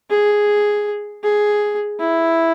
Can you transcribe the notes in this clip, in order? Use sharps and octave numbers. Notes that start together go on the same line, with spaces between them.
G#4
G#4
E4